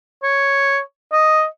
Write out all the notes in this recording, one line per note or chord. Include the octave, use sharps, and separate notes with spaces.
C#5
D#5